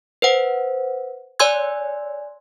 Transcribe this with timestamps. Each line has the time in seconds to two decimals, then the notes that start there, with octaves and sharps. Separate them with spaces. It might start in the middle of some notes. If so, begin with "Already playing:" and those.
0.22 B4 C5 F#5
1.39 C#5 D5 G#5 C6 E6 G#6